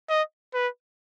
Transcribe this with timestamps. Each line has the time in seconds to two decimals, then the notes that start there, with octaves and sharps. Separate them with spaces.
0.09 D#5
0.54 B4